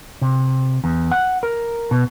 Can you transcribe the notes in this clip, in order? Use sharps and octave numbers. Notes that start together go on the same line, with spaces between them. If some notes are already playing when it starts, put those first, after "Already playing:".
C3
E2
F#5
A#4
B2